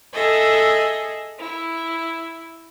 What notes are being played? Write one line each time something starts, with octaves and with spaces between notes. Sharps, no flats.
G#4 A4 D#5 E5
E4